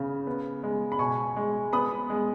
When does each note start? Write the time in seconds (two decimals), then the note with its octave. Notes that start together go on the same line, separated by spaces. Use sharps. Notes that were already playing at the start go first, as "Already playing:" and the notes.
Already playing: C#3 B3
0.27 B3
0.63 G#3
0.92 B5
0.99 B2 G#5 C#6
1.36 G#3
1.73 B3 B5 D#6
2.10 G#3